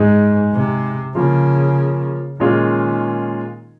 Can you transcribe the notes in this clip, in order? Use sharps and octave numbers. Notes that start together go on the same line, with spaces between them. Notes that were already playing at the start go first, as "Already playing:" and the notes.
Already playing: G#2 G#3 D#4 G#4
C3
C#3 F3 A#3 F4
A#2 D#3 G#3 C#4 F4 G#4